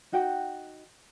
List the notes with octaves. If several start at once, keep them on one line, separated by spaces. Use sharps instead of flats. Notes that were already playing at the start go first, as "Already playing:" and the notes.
D#4 F#4 F#5 G5